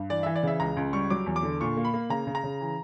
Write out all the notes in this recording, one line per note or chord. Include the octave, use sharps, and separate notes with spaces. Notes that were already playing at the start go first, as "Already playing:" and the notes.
Already playing: G2
E3 D5
E3 E5
D5
C#3 E5
C#2 A#5
C#2
G3 C#6
F#3 D6
E2
D6
D3
A#2 C#6
A#3
B5
A#3
C#3 A#5
C#3
A#5
C#3
E3